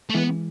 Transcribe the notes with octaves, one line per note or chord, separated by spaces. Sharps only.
A3
E3 G#3 B3